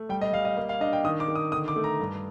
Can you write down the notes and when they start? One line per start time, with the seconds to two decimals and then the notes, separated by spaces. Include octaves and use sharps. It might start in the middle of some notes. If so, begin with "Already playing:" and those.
Already playing: A3
0.09 G3 G5
0.21 D#5
0.33 G3 F5
0.45 D#5
0.57 A#3 D#5
0.69 F5
0.80 D4 D#5
0.93 G5
1.05 D#3 D#6
1.20 D6
1.28 D#3
1.35 D#6
1.52 D3 D#6
1.68 D6
1.76 A3
1.84 A#5
2.00 G2